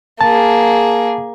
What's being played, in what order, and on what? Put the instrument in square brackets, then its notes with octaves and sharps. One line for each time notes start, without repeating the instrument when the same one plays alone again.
[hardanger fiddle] A#3 G#4 [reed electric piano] A5